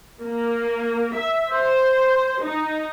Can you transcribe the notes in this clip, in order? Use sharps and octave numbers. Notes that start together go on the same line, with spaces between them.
A#3
E5
C5
D#4